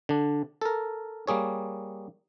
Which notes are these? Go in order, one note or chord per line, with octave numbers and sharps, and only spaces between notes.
D3 D4
A4 A#4
G3 A#3 G#4 C#5